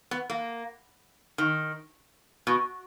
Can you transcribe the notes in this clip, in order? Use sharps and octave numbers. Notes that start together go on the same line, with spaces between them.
B3
A#3
D#3
B2